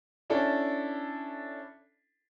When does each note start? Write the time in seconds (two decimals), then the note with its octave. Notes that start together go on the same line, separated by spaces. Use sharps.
0.30 C#4 D4 E4 A4